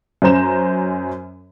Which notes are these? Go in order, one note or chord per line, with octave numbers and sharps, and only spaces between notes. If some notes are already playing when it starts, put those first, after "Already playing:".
F#2 C#4 C5 A#5 E7